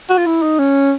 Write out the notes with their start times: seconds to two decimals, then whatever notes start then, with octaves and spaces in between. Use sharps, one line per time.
0.09 F#4
0.18 F4
0.26 E4
0.42 D#4
0.59 C#4